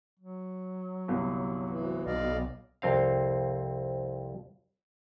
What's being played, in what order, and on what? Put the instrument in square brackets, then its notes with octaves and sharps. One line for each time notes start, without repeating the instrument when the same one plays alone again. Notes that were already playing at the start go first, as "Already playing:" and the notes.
[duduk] F#3
[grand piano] G1 C2
[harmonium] D2 E3
[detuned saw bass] B1 [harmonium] D5 D#5 F5
[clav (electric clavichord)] C2 F2 C4 F5